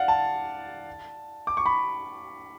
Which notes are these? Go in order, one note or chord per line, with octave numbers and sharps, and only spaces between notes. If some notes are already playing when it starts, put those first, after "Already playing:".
Already playing: D5 F5 F#5
A5
D6
C#6
B5